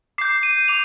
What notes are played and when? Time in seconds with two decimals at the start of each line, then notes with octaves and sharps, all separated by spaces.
0.18 D6 C7
0.21 G6
0.43 D#7
0.68 D6 G6 F7